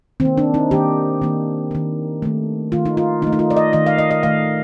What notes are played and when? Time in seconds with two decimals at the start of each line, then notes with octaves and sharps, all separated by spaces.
0.20 D#3 C4
0.25 A#3
0.38 D4
0.54 D#4
0.71 D#3 A#3 G4
1.22 D#3 A#3
1.71 D#3 A#3
2.22 D#3 A3
2.72 D#3 A3 F4
2.85 D#4
2.97 F4
3.22 D#3 A3 D#4
3.33 D#4
3.39 F4
3.50 D5
3.56 D#5
3.73 D#3 A3 D#5
3.86 F5
3.98 D#5
4.11 D#5
4.23 D#3 A3 F5